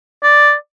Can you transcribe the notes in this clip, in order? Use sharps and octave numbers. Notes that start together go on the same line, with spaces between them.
D5